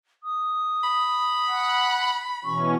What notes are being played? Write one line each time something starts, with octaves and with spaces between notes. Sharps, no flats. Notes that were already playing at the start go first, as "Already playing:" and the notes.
D#6
B5
F#5
B2 E3 C#4 C#6